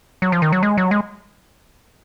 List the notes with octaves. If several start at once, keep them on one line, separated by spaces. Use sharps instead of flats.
F#3
F3
D#3
F#3
G#3
F#3
G#3